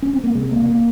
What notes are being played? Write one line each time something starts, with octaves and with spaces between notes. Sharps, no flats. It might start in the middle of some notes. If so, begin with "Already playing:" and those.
C#4
C4
A#3
C3 G#3
C#2 A#3
A#3